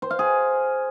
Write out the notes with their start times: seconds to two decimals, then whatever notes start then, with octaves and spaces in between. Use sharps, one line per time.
0.02 C5
0.11 F5
0.19 G#4